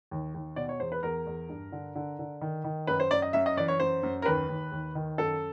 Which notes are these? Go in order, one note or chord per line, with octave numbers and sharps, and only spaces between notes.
D#2
D#2
B2 D5
C#5
E2 C5
B4
E2 A#4
E2
G2
D3
D3
D3
D#3
D#3
F#2 B4
C5
F#2 D5
D#5
F#2 E5
D#5
E3 D5
C#5
F#2 C5
F#2
A#4
D#2 B4
D#2
D#2
D#3
F#2 A4